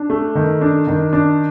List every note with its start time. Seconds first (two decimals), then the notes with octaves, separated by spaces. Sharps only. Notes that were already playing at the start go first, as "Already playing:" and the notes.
Already playing: D4
0.10 A3
0.35 D#3
0.61 D4
0.87 D#3
1.13 D4